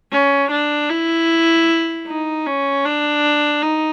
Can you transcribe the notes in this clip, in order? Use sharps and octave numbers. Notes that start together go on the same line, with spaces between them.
C#4
D4
E4
D#4
C#4
D4
D#4